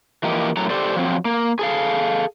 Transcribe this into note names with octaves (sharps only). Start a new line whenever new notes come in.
E3 F3 A#3 G4 A#4 D#5
F#2 A2 F#3 A4 A#5
G4 A4 C5 D5
F3 F#3 C4
A#3
G#4 A4 F5